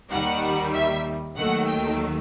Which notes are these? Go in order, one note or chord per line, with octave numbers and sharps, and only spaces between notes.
D#2 D#3 G3 F#5
E5
D#2 D#3 F#3 A3 F#5
G5